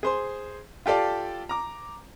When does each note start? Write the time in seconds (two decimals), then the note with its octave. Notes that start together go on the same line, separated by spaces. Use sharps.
0.03 G#4 C5 C6
0.86 F4 G4 A4 D5 F5
1.49 A#5 D6